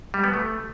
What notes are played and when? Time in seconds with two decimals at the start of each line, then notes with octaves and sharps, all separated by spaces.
0.14 G3
0.24 B3
0.34 A3